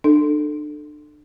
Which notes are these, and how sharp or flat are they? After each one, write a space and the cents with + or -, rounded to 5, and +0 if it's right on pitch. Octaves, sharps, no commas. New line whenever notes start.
D4 +35 A4 +0